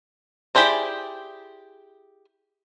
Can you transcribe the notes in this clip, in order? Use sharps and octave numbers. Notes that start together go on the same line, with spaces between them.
E4 G4 G#4 C5 D5